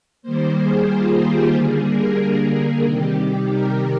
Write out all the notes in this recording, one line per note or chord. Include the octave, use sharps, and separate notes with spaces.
D#3 G3 A#3 C5
G#4
F4
G4
D3 G3 A#3 G#4
A#4
A#4
C3 D#3 G3 G4
A#4